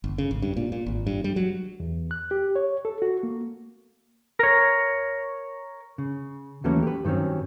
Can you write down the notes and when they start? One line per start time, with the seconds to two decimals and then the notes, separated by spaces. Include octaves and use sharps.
0.04 G1
0.18 C#3
0.31 G#1
0.42 G2
0.57 A#2
0.72 A#2
0.86 G#1
1.07 G2
1.24 G3
1.36 F#3
1.80 E2
2.11 F#6
2.31 G4
2.56 C#5
2.85 A4
3.02 F#4
3.23 A#3
4.39 A#4 C#5
5.98 C#3
6.64 D#2 E3 F#3 A3 A#3 C#4
6.82 G4 B4
7.05 G2 D#3 F#3 C4 C#4